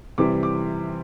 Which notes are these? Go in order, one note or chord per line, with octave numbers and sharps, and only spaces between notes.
C3 E3 G3 D6
D6